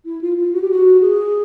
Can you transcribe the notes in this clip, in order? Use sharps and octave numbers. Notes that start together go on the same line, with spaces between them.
E4
F4
F4
F#4
G4
F#4
G#4